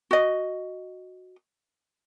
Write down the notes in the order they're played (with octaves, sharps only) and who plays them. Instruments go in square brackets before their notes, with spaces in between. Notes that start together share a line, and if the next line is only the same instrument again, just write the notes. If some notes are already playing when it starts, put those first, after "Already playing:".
[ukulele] F#4 D#5